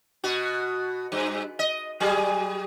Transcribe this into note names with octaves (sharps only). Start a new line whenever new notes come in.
B2 F#4
G2
D#5
F#3 G3 G#4